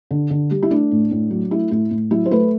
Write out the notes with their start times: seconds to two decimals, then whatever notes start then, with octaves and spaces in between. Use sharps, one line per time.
0.11 D3
0.30 D3
0.51 G3
0.63 E4
0.71 A3 D4
0.92 A2
1.11 A2
1.31 F#3
1.51 A3 E4
1.71 A2 E4
1.91 A2
2.11 F#3 E4
2.26 C5
2.31 A3 B4